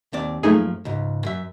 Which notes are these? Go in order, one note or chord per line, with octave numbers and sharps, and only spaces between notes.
D#2 C4 D5
F#2 F3 A3 A#3 D#4 G#4
C#2 G#2
F#2 E5